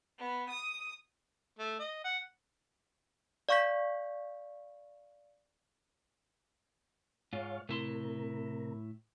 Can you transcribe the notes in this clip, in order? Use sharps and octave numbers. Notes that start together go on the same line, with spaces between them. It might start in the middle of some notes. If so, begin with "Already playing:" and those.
B3
D#6
A3
D#5
F#5
D5 F5 C#6 G6 B6
G#2 F4 C#5 F5
A2 C3 E4 A#4 C6